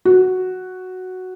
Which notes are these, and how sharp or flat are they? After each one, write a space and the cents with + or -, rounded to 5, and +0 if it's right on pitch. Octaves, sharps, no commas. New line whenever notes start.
F#4 +0